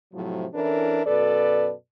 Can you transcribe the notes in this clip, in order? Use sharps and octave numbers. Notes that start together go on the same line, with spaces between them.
A2 C3 F3 F#3
E3 C#4 D4 E4 A4 A#4
F#2 B2 A4 B4 D5